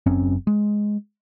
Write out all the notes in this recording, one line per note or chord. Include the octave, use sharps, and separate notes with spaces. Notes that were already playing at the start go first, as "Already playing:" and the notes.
F#1 F#2 C4 C#4
G#3